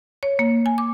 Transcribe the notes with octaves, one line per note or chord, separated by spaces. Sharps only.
C#5
A#3
G#5
D6